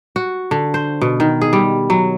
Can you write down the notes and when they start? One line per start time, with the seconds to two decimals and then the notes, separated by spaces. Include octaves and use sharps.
0.16 F#4
0.51 D3
0.74 C5
1.01 B2
1.20 D#3
1.41 G#4
1.53 G3
1.90 F#3